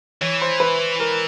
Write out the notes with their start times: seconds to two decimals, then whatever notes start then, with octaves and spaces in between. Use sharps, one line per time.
0.21 E3 C#5
0.42 C5
0.60 B4
1.00 A#4